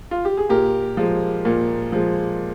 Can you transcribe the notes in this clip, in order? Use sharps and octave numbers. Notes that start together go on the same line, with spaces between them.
F4
G4
G#4
A#2 G4 A#4
F3 G#3
A#2
F3 G#3